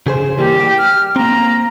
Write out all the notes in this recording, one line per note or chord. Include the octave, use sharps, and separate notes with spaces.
C#3 G#4 C5
E3 G3 A#3 G4
G5
F6
A#3 C4 A#5